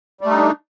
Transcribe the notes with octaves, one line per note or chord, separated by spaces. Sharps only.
G3 A3 D4 D#4